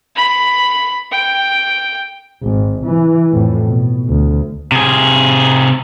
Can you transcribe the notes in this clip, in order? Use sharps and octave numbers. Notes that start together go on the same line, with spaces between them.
B5
G5
G#1
E3
F2 A2
B2
D2
C3 G#4